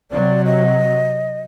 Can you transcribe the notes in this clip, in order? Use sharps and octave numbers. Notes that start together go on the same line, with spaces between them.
C3 F#3 D5
D#5